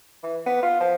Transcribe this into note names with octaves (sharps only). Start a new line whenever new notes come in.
E3
B3
F4
F3